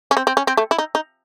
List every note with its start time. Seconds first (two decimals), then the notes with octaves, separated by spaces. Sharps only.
0.11 C#4
0.17 C4
0.27 C4
0.37 C#4
0.47 C4
0.57 A3
0.71 E4
0.78 D#4
0.95 D#4